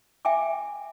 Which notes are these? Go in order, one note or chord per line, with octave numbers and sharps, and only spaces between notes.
E5 G5 G#5 D6